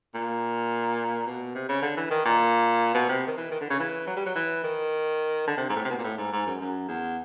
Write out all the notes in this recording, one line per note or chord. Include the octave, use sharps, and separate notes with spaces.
A#2
B2
C3
C#3
D3
E3
D#3
A#2
B2
C3
D#3
E3
D#3
D3
C#3
E3
F#3
G3
F#3
E3
D#3
D3
C3
G#2
A2
C3
B2
A#2
A2
G#2
G#2
F#2
F#2
E2